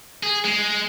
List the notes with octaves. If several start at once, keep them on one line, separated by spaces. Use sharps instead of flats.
G#4
G#3